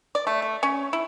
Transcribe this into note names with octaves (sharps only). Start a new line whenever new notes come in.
D5
A3
A3
C#4
E4